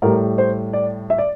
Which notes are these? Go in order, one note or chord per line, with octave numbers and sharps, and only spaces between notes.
A2 G3 A#4
C5
D5
E5
D5